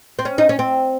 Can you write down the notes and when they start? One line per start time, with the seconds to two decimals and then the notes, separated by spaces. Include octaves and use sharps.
0.19 C4
0.25 C#4
0.38 D#4
0.49 C#4
0.59 C4